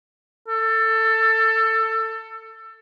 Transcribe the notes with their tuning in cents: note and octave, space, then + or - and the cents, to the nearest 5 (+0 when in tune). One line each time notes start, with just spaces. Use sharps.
A4 +20